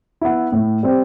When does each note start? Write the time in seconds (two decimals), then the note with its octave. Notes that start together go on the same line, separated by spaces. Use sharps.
0.21 B3 E4
0.52 A2
0.83 G3 C4 G4